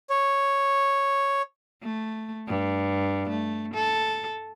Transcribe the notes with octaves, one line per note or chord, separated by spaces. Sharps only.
C#5
A3
G2
A3
A4